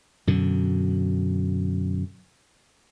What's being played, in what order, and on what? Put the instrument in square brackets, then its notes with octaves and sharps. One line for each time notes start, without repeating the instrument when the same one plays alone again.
[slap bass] F#2 B2 D3